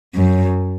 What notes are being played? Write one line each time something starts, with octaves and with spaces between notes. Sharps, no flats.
F#2